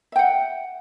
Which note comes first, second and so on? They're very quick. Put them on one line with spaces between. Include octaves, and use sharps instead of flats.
E5 G5 F#5